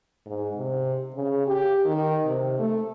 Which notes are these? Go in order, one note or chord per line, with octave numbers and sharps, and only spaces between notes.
G#2
C3
C#3
G4
D#3
C3
A3